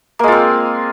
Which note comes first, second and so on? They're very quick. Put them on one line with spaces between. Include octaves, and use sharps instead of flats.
A#3 G#3 F4 C4